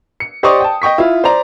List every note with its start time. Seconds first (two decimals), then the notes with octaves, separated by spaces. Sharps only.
0.20 C#7
0.43 G4 C5 D5 D#5 C#6 D#6
0.60 G5 A5
0.82 D#5 G5 C#6 B6
0.98 E4 F4
1.24 C5 D5 A#5